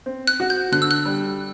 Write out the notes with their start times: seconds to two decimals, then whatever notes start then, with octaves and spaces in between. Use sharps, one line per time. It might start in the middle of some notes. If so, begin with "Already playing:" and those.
0.06 C4
0.27 F#6
0.40 F#4
0.50 G6
0.72 D3 F#6
0.82 E6
0.91 F#6
1.05 G3